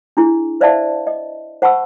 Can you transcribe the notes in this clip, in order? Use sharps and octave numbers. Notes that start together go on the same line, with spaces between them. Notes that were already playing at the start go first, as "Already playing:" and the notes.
D4 E4 G#4
B4 C5 D5 E5 F5 A5
D#5
C5 F#5 A5 B5 C#6 E6